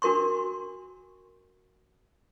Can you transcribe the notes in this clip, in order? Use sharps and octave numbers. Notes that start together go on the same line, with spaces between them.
D4 F#4 A#4 C6 C#6